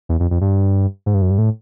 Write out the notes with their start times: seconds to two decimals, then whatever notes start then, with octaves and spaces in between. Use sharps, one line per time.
0.09 E2
0.20 F2
0.31 F2
0.41 G2
1.06 G#2
1.14 G2
1.22 F#2
1.30 G2
1.38 A2